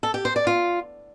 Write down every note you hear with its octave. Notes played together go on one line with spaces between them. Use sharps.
A4
G4
C5
D5
F4